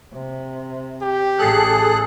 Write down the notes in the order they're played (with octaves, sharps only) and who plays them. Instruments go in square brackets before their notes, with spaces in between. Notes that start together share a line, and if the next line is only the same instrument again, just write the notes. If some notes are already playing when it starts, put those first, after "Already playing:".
[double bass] C3
[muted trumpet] G4
[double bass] A1 A2 [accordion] G#4 A4 F#6